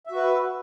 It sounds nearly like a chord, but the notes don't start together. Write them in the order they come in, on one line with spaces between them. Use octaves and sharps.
E5 F#4 B4